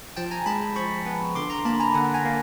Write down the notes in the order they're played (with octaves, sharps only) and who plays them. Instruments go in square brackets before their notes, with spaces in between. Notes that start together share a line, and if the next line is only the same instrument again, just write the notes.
[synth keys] F3 G5 A5
G#5 A#5
G#3 A5 B5
F3 B5 C#6
B3
D3 C6 D6
A#5 C6
A#3 A5 B5
G#5 A#5
D3 F#5 G#5
G#5 A#5
A#3